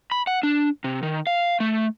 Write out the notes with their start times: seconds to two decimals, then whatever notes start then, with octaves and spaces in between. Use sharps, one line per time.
0.11 B5
0.27 F#5
0.43 D4
0.84 C3
1.03 D#3
1.27 F5
1.60 A3